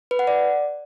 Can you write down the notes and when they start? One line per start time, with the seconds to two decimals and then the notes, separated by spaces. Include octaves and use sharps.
0.11 B4
0.19 F#5
0.27 D5